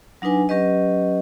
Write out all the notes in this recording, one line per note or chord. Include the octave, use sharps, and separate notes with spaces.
F#3 D4 D#4 B4 G#5
F#3 C#4 G4 B4 D#5